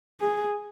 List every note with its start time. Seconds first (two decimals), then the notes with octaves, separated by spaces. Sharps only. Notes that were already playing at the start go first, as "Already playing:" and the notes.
0.21 G#4